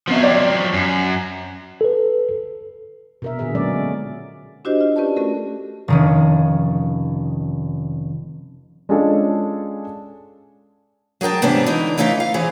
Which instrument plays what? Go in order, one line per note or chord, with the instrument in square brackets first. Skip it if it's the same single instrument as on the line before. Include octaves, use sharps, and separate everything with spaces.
[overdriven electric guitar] F3 F#3 [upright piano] B3 C4 E5
[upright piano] C#5 D5 G5
[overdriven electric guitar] F#2
[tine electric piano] A4 B4
[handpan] B2 A#4 E5
A#2 D3 G#4 E5
F#3 G#3 B3 C#4 D5
[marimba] D4 E4 F#4 G4 C5 D#5
F4
C#4 G4 B4 D5 A5
A3 C#4 F#4 A4 A#4
[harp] F1 D#3 C#4
[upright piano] G#3 C#4 D4 F4 G#4 A4
[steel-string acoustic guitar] F#3 G#4 A#4 G5 A5
G#2 C3 E3 B3 C#4 D4
D3 E3 D#4
E3 A3 C#4 D#4 F4
F5
E3 C4 G#4 C#5